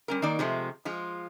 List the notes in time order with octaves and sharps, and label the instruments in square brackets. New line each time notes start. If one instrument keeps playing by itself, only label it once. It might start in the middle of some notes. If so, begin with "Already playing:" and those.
[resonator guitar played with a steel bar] G3 C#4 A#4
D#3 A#3 D#4 A#4 D5
C3 F3 G#3 A3
F3 G#3 F4